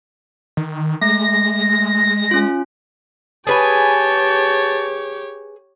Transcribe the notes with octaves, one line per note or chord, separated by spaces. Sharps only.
D#3
G#3 A3 A#6
C#4 F4
G4 G#4 B4 C#5 G#5 A5